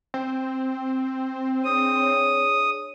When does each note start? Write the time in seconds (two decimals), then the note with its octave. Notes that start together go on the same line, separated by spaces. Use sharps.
0.14 C4
1.64 D4 G#4 C#5 D#6